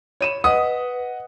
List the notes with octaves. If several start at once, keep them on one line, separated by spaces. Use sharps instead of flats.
C#5 B5 D#7 E7
B4 D#5 F#5 D#6